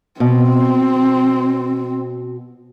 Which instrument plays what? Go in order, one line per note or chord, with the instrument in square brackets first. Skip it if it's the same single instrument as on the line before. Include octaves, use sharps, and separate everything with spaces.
[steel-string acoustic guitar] B2 [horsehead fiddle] C4